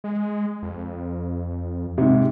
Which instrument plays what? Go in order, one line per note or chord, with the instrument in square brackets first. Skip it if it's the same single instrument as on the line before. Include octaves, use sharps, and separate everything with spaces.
[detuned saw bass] G#3
F2
[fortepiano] G#2 C3